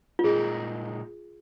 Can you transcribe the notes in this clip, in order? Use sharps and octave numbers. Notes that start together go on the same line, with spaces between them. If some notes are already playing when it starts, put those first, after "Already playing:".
F4
A#2 G#3 D#4 G#4 A#4